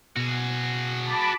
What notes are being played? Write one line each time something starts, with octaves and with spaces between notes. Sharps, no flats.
B2 F#4 G#4
A5 B5 D6